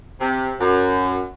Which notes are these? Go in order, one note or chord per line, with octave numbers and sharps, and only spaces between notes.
C3
F#2